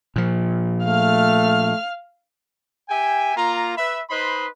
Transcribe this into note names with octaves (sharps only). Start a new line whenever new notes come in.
A#2 F3
A3 F5 F6
G4 E5 G5 G#5
A#3 F4 A#5
B4 E5 B5
D#4 B4 C5 D#5 B5 C6